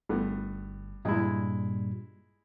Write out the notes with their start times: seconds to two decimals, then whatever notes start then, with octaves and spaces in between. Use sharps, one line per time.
0.09 G1 G2 A3 B3
1.05 G2 A#2 G3 G#3 E4